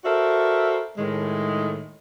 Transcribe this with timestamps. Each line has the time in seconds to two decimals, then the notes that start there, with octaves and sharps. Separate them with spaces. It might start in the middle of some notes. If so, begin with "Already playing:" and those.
0.05 F#4 A4 A#4 C5 D5 E5
0.97 A2 D#3 G#3